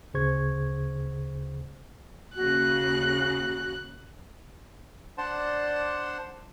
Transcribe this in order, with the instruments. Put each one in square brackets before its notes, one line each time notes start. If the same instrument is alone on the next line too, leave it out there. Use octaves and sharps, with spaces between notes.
[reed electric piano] D2 C#3 G#4 C5 C#6 G#6
[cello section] D#2 C#3 [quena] F#4 [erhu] F#6
[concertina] D4 C5 D5 F#5 A5 C6